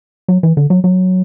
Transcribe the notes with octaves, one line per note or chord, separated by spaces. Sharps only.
F#3
E3
D3
F#3
F#3